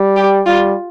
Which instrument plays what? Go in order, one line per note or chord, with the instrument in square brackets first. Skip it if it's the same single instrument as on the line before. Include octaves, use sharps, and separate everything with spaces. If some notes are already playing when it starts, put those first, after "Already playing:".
Already playing: [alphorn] G3
[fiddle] G4
[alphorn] G3 [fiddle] F4